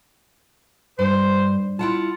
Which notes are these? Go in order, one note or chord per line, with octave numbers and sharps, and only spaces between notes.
G2 C5
E4 F4 F#5 A5